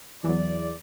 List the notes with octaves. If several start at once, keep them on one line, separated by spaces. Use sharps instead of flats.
E2 E3 F#3 D5